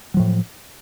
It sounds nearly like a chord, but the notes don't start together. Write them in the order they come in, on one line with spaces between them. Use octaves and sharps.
F#3 F3 A2